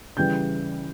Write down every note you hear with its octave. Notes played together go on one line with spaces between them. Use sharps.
C#3 E3 G3 G5 G6